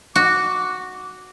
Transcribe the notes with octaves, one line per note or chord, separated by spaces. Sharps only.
F#4 D6